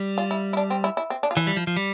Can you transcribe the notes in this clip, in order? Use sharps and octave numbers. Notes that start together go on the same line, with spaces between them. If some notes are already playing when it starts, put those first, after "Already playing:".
Already playing: G3
F4
E4
E4
D4
C4
E4
E4
C4
D4
F4
E3 E4
G3
F3
F3
G3